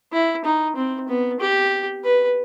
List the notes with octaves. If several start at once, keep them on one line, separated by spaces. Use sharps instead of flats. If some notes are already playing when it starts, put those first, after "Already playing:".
E4
D#4
C4
B3
G4
B4